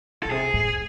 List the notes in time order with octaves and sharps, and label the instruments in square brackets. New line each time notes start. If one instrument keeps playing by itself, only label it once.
[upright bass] B2 [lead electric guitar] A4
[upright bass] C3 [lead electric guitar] G#4
[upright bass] A2